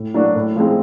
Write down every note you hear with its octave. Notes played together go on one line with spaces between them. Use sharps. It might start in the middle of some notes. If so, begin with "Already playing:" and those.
Already playing: A2
F#3 A#3 D4 F#4
A2
F3 G#3 C4